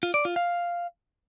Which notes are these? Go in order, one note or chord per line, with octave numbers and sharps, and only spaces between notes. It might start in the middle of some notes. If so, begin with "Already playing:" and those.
F4
D5
F4
F5